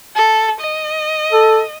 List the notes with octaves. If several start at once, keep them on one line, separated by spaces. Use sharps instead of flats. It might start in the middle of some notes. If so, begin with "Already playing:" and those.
A4
D#5
A4